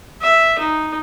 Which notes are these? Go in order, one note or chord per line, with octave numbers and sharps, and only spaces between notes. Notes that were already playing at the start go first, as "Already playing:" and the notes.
E5
D#4